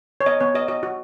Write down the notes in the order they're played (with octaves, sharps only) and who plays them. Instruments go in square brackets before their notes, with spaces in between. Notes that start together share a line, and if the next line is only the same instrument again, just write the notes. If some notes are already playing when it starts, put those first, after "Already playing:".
[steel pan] C#5
B3 D#5
B3 C#5
F#4 D#5
F#4 D#5
F#4